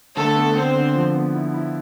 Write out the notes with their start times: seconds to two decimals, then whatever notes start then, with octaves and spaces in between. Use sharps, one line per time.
0.16 D3 A3 A4
0.36 B3
0.56 D3 C4 C5
0.76 D3
0.95 F3
1.15 B3
1.35 E4
1.54 E4